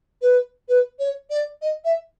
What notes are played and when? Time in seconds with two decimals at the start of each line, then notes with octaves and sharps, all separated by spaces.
0.22 B4
0.69 B4
0.99 C#5
1.30 D5
1.62 D#5
1.85 E5